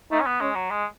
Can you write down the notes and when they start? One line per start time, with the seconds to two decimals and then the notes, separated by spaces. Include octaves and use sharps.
0.11 A3 D#4
0.20 C#4
0.26 B3
0.41 G#3 C#4
0.55 F#3
0.70 G#3